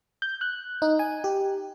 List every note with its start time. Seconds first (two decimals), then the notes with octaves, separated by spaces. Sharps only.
0.22 G6
0.41 F#6
0.82 D#4
0.99 G#5
1.24 G4